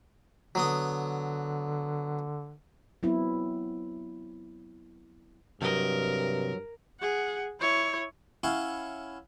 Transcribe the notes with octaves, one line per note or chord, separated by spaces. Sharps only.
D3 F#3 B3 D#6
F#3 B3 C4 E4
G2 C3 F#3 C4 A#4 D#5
G#4 F#5
E4 C#5
C#4 E4 C#5 F5 F#5